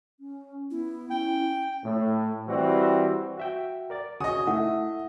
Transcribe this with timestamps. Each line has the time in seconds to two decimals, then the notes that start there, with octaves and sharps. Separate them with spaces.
0.20 C#4
0.71 B3 E4
1.10 C#4 G5
1.83 A2
2.47 E3 G3 C4 F#4
3.38 F#4 E5 G5
3.90 A#4 D5 A6
4.20 C#3 F#4 D#5 G#5 C#6 D#6
4.47 A3 E4 E5 F#5